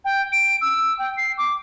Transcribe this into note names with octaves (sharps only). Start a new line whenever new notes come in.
G5
D7
E6
G5
C7
D6